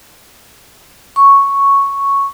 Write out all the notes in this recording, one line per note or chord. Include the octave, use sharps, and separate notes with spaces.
C#6